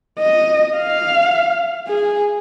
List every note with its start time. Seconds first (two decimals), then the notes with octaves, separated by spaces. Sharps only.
0.19 D#5
0.77 F5
1.88 G#4